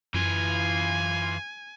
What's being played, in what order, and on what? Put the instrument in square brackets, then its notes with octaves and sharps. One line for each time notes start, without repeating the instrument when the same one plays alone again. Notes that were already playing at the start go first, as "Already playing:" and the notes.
[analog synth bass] F#2 [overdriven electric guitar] E3 F4 [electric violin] G#5